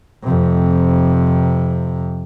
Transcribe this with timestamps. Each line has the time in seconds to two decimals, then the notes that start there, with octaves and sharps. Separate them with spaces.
0.24 F2 C3